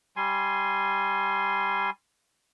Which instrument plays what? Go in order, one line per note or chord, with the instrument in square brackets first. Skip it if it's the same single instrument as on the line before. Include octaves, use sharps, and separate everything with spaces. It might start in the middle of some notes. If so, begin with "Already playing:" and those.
[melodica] G3 G#5 C6